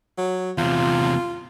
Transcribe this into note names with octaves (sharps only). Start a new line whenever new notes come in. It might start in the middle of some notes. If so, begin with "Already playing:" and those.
F#3
E2 C3 F4